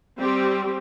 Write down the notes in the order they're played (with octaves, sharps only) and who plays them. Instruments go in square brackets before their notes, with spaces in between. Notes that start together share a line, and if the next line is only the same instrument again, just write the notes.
[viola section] G3 C4 G4